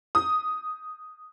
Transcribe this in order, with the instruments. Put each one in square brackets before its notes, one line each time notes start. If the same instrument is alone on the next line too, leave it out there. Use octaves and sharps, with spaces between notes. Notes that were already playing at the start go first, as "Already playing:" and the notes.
[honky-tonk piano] D#6